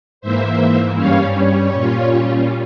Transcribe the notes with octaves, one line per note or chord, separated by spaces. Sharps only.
G#2 E3 A#3 C5 E5
G2 G3 C#4 C#5 F5
C#5
A#2 G3 C#4 F4